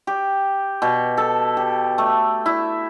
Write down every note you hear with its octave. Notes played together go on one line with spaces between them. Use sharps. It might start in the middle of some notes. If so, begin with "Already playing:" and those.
G4
B2
A4
G4
A3
E4